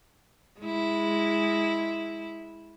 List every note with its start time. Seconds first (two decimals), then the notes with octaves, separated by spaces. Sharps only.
0.61 G#3 E4